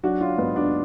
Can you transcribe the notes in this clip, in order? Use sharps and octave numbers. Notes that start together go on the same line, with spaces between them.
F#3 D4 F#4
C#4 F4
G#2 B3 D4
D4 F#4